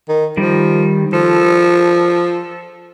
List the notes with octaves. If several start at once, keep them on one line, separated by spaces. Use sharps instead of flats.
D#3
D#3 F3 G3
F3 A4